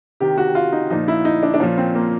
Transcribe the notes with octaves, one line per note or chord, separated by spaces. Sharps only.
C3 D#3 G4
F#4
F4
D#4
A#2 F3 D#4
E4
D#4
D4
D4
A#2 F3 C#4
C4
A#3